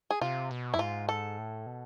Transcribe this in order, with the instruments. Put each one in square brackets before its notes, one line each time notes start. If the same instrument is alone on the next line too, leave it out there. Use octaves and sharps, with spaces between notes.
[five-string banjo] G#4
[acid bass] C3 [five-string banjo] F4
[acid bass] B2
[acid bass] F2 [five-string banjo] E4
[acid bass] G#2 [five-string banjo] F4
[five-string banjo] A4
[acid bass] A2
B2